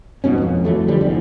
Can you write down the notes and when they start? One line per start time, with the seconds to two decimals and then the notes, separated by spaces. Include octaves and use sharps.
0.24 D#1 G#2 B2 C#4
0.38 A1 F2
0.65 E3 F#3 A3
0.88 D3 F3 G3
1.01 F1 E2 G#2